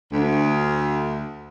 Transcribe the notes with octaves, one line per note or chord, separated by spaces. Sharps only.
D2